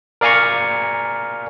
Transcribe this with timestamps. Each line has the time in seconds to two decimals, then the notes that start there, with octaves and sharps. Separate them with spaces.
0.21 A#4 D5 F5 G#5 A#5 C#6